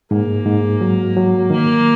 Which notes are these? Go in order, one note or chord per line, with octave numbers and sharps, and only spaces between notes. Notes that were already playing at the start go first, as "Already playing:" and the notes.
G#2 A#3
G#2
F#3
F#3
D#3 A#3